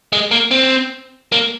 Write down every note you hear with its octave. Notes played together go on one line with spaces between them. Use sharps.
G#3
A#3
C4
A#3